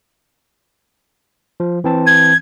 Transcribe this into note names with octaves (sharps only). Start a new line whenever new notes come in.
F3
E3 C4 A5
G#6